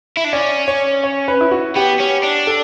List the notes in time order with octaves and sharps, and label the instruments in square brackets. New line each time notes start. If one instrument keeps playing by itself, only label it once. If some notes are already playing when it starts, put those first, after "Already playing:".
[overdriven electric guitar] E4
D4
[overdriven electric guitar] C#4 [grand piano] D5
[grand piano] C#5
C#5
B4
E4
F#4
[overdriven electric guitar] B3 [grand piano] G4
[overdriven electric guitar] C#4
D4
[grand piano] A4